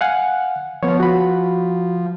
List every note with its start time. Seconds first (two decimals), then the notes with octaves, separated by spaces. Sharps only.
0.01 F5 F#5 G#5
0.83 F3 B3 C#5
1.00 F#4 B5